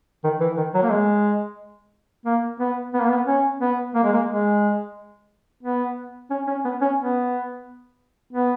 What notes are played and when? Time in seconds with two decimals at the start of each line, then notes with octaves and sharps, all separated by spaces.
0.24 D#3
0.40 E3
0.57 D#3
0.74 F#3
0.83 A#3
0.90 G#3
2.25 A#3
2.60 B3
2.94 B3
3.00 A#3
3.09 B3
3.27 C#4
3.61 B3
3.94 A#3
4.03 G#3
4.13 A#3
4.28 G#3
5.63 B3
6.30 C#4
6.47 C#4
6.65 B3
6.81 C#4
6.98 B3
8.33 B3